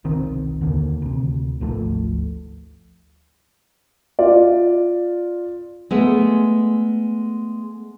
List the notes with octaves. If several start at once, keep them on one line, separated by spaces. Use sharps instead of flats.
E1 C2 D#3 C4
D#2 D3 D#3 A#3
D2 C3
G#1 D2 F3 A3
F4 D5
G#3 A3 B3